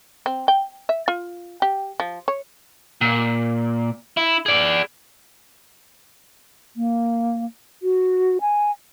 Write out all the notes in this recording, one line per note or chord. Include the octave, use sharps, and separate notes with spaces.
C4
G5
E5
F4
G4
F3
C#5
A#2
E4
G#4 D5
A#3
F#4
G#5